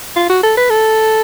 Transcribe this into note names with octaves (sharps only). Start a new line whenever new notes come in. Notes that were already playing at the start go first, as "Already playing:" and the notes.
F4
F#4
A4
B4
A4